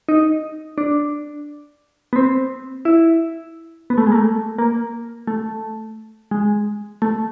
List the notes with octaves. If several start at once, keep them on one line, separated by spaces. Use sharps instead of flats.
D#4
D4
B3
C4
E4
B3
A3
G#3
A#3
A3
A#3
A3
G#3
A3